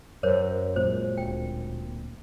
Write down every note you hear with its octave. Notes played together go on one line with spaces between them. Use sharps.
F#2 A#4 C5 C#5
A#2 F#3 G#3 C5
D1 G5